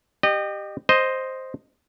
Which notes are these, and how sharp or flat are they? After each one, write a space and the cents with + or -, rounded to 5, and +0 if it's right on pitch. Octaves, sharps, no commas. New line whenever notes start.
G4 +0 D#5 -30
C5 +0 D#5 +0